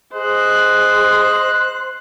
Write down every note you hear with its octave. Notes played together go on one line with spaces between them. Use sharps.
G#4 C5 D#5 F#6